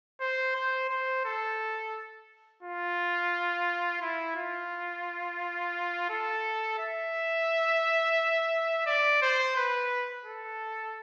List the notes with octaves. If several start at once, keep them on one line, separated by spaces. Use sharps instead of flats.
C5
C5
C5
A4
F4
E4
F4
A4
E5
D5
C5
B4
A4